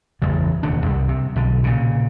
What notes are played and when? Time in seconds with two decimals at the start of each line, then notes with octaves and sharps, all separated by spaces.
0.22 A1 E2 G2 C#3
0.63 E1 D#2 C#3 D4
0.86 C2 G3
1.09 C3
1.36 B1 D3
1.64 A#2 C#3